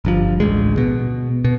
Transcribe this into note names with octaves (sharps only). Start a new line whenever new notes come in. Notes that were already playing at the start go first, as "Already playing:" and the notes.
G1 G2 F3
A1 D2 G#3
B2
B2